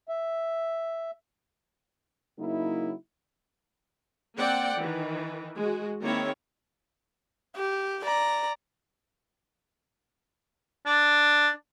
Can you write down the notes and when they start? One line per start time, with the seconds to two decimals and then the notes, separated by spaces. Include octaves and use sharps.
0.09 E5
2.39 C#3 F#3 A#3 D#4 E4
4.38 A#3 C4 D5 F#5 G5
4.77 D#3 E3
5.57 G#3 F#4
6.02 D#3 A#3 C4 E4 G#4 C#5
7.56 G4
8.04 D5 A#5
10.86 D4